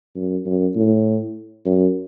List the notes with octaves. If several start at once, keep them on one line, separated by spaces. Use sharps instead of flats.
F#2
F#2
A2
F#2